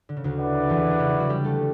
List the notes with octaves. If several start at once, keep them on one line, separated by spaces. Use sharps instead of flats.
D3
C#3
D2 D3
E4 B4 D5 F#5
E2 E3
D4
C#3 C#4
D3 D4
F#3 F#4
G3 G4
A3 A4